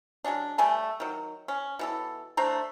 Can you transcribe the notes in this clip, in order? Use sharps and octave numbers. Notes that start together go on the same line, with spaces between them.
F#3 G#3 C#4 D4
G3 A3 G#5 A5
D#3 F#3
C#4
B2 E3 A4
A3 D4 C5 A#5